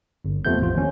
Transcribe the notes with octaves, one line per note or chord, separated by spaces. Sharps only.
G1
E2 C3 F3 A3 B3 G6
A1 F4
D#2 C#4